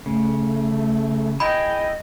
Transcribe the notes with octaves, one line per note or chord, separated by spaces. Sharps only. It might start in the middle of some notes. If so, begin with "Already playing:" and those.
C#3 A3
E4 G#4 D#5 G5 B5